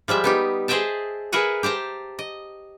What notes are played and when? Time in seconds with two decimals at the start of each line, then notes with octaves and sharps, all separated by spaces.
0.08 F3 G3 G#3 E5
0.24 B3 D#4 G4
0.68 G#4 C5 D#5 E5 G5 A5
1.32 G#4 A#4 B4 E5 F#5 G#5
1.63 G4 C5 A5 A#5
2.19 D#5